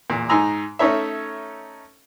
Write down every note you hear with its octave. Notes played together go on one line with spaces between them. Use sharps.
E2 A#2
G#2 D#4 G#5 A#5 E6
A3 C#4 D#4 C#5 E5